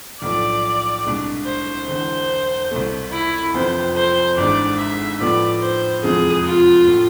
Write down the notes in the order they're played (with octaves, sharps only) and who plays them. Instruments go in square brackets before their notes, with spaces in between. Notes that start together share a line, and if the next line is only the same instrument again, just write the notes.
[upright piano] B1 A2 F3 [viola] D5
[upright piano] C2 B2 G#3 D4
[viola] C5
[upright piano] E1 E2 D3 [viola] C5
[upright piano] C2 B2 A3
[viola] E4
[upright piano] F1 F2 E3 B3 F4 [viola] C5
[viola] C5
[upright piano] G#1 G#2 E3 G#3 D4 [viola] D5
[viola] E5
[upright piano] A2 F3 B3 [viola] D5
[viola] C5
[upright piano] F1 E2 C3 F3 G#3 [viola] G#4
[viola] F4
[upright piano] A2 F3